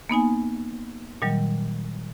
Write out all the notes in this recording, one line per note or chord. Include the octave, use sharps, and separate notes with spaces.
A#3 B3 D#4 G#5
A#2 D#3 F#3 G3